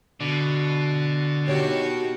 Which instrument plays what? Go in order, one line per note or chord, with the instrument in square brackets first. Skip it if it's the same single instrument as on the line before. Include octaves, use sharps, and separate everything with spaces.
[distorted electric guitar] B2 [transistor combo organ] D3
[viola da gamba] D#3 F#4 G4 [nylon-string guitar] C#5